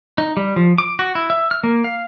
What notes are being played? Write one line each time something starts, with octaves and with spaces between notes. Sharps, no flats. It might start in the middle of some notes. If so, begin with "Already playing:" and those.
D#4
G3
F3
D6
F#4
E4
E5
F6
A#3
F5